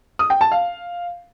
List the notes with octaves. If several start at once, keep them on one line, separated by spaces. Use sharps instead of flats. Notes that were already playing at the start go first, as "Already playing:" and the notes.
D#6
G5
A5
F5